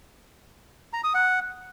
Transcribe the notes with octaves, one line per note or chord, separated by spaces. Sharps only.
A#5
D#6
F#5